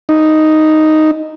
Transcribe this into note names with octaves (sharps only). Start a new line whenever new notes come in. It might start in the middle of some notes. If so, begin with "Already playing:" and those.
D#4